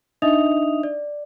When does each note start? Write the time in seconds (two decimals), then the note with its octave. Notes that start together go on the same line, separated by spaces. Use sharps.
0.22 D4 D#4 D#5 E5 D#6 F7
0.83 D5